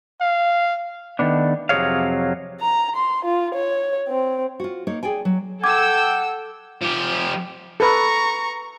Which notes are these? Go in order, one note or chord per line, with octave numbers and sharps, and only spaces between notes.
F5
D#3 A3 B3 D4
F2 C3 F#3 G#4 C#5 F5
A#5
C6
F4
C#5
C4
F4 F#4
A#3 D#4 C#5
G#4 D5 G5 G#5
F#3
A4 F#5 G5 D6 E6 G#6
F3 G4
A4 B4 A#5 C#6